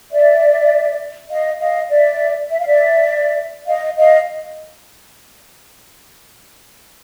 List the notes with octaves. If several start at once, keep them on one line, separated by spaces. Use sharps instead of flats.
D5 E5
D#5 F5
D#5 F5
D5 E5
E5
F5
D5 E5
D#5 F5
D#5 F5